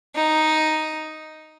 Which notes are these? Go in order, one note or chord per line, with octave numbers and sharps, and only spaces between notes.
D#4